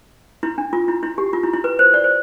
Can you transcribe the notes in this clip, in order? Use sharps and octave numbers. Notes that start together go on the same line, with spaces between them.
E4
D4
F4
E4
E4
G4
F4
E4
E4
B4
C5
D5
C5